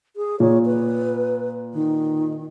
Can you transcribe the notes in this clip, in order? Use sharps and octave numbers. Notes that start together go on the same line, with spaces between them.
G#4
A#2 C#5
B4
D#3